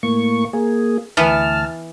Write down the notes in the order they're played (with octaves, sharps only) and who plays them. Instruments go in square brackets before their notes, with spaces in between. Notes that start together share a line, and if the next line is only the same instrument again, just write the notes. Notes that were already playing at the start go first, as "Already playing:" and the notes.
[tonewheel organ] A2 A#3 C#6
A#3 G#4
[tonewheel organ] D2 A5 F6 [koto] E3 B3